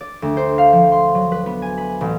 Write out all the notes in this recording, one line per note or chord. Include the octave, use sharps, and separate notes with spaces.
D5
D2
C5
F5
F3
C6
F#3
B4
B3
G#5
B5
A1